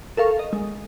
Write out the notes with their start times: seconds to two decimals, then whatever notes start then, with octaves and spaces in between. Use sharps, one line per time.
0.17 A4 A#4 F5 C#6
0.39 D#5
0.53 G#3